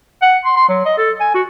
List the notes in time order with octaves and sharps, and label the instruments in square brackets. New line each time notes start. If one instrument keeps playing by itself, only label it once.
[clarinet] F#5
C6
C6
F#3
D#5
A4
G#5
F#4